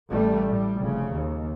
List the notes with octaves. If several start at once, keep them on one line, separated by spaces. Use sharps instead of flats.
A1 G3 A3
A2 G3
F1 C#3
D#2